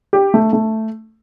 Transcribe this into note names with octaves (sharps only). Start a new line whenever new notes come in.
G4
A3
A3